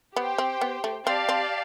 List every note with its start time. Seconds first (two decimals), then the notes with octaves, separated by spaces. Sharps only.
0.16 B3 G4 C5 G5
0.38 C4
0.61 B3
0.84 A3
1.06 C4 G4 D5 F5 A5
1.29 C4